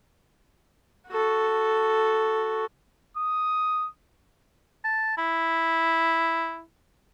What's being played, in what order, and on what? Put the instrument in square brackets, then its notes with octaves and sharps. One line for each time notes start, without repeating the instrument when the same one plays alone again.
[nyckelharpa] F#4 A4
[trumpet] D#6
[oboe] A5
E4